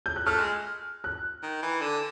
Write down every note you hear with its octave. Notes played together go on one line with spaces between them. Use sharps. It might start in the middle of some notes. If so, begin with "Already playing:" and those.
G6
F#6
A3 F6
G#3
F#6
D#3
E3
D3